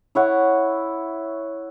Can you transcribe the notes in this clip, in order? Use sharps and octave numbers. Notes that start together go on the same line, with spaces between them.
E4 C#5 F#5